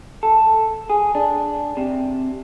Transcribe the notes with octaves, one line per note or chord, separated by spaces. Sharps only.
A4
G#4
D4
C3